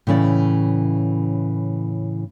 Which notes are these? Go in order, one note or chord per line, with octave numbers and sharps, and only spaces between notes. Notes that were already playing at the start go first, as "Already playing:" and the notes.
A2 C#3 E3 C#4 D5